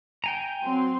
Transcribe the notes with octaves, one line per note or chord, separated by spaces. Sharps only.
G5 G#5 A#5
F#3 C4 C6